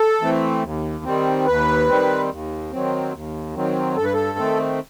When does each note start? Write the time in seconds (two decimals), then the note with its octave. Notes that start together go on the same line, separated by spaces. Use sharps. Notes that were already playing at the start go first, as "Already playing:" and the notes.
Already playing: A4
0.21 E3 A3 C4
0.63 D#2
1.05 D#3 G3 C4
1.47 D#2 B4
1.88 D#3 G3 C4
2.30 D#2
2.71 D#3 F#3 C4
3.13 D#2
3.55 D#3 F#3 C4
3.96 G2 A4
4.05 B4
4.13 A4
4.38 D#3 A3 C4